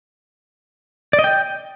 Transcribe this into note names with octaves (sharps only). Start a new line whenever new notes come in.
D5
D#5
G5